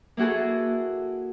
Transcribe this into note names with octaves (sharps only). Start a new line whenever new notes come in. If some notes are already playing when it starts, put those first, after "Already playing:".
A#3 E4 F#4 G#4 A4